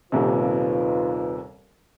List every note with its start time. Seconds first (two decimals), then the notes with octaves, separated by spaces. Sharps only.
0.12 D#1 D#2 C3 D#4 F4 B4